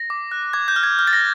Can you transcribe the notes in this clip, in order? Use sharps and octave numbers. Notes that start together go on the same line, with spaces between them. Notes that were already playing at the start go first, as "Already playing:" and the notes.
Already playing: A#6
D6
F#6
D6 G#6
G6
F6
G#6
F6
A6
A#6